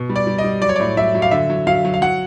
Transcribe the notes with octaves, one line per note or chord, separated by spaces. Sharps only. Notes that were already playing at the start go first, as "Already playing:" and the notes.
Already playing: B2
G3
D5
G3
D#5
G3
F#3 D5
C#5
A2 D5
F#3 E5
F#3
F5
D3 E5
F#3
F#3 F5
F#3
F5
F#3 F#5